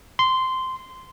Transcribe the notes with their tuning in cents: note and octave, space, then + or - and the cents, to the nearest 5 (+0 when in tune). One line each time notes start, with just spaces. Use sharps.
C6 -10